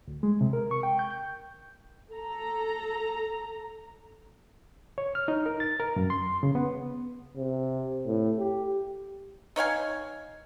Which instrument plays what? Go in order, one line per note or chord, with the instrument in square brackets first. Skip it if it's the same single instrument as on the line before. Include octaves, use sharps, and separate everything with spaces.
[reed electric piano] D2
G#3
C3
A#4
C#6
G5
G6
[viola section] A4 A#5
[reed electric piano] C#5
F6
D#4
A#4
A6
A#4
F#2
C6
C#3
B3
[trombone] C3
A2
G4
[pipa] D#4 C#5 F5 G#5